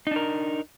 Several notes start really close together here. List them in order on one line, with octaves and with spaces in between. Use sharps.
D#4 D4 A#4